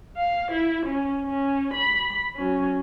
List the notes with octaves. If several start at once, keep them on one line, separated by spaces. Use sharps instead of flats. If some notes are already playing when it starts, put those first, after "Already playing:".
F5
E4
C#4
C#4
B5
F#3 C#4